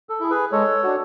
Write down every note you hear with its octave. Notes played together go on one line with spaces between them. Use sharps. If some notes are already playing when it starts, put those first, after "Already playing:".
A4
E4 G#4
G#4 B4
G#3 A4 C#5
D4 F#4